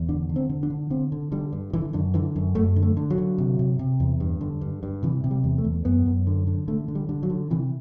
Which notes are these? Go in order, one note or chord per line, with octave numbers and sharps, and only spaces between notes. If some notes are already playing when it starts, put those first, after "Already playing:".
Already playing: E2
D3 D4
D3
C4
D3
D4
D3
D3 C4
D3
D3 G3
G2
D3 E3
F#2 D3
D3 E3
F#2
F#2 A3
D3
A3
D3
F#3
D3
C3
C3
C3
E2
G2
D3
G2
G2
C3 E3
C3
G3
E2
A3
E2
F#2 B3
F#2
D3
D3
D3 A3
D3
G3
D3
F#3
D3
C3 E3